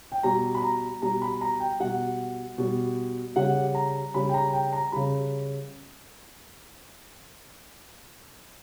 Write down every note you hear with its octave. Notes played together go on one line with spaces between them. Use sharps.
G5
B2 G3 A#5
B5
A#5
B2 G3 A#5
B5
A#5
G5
B2 G3 F#5
B2 G3
C#3 G3 F#5
A#5
C#3 G3 B5
G5
A#5
G5
A#5
C#3 G3 B5